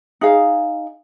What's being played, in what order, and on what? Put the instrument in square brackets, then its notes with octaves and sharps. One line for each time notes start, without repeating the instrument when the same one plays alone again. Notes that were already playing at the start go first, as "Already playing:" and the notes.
[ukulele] D#4 G#4 F5